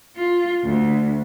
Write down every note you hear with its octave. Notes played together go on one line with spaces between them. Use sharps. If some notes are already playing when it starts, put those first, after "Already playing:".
F4
D2